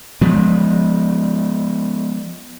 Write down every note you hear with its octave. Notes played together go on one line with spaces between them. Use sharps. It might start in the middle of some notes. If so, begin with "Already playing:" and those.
F3 G#3 B3